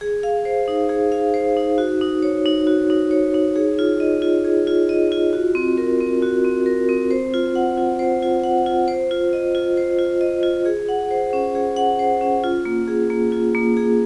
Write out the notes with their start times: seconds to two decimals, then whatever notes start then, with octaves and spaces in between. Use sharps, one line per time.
0.01 G#4
0.23 F5
0.45 C5
0.68 D#4
0.89 G#4
1.12 F5
1.34 C5
1.57 D#4
1.78 F#4
2.01 D#4
2.23 C#5
2.46 D#4
2.67 F#4
2.90 D#4
3.11 C#5
3.34 D#4
3.56 G#4
3.79 F4
4.00 D#5
4.22 F4
4.45 G#4
4.67 F4
4.89 D#5
5.12 F4
5.33 F#4
5.55 C4
5.78 A#4
6.00 C4
6.22 F#4
6.44 C4
6.66 A#4
6.89 C4
7.11 C5
7.34 F4
7.55 F#5
7.78 F4
7.99 C5
8.22 F4
8.43 F#5
8.66 F4
8.88 C5
9.11 F4
9.33 D#5
9.55 F4
9.77 C5
9.99 F4
10.21 D#5
10.43 F4
10.65 G#4
10.89 F#5
11.11 C5
11.33 C#4
11.55 G#4
11.77 F#5
11.99 C5
12.21 C#4
12.44 F4
12.65 A#3
12.88 G#4
13.10 A#3
13.32 F4
13.55 A#3
13.77 G#4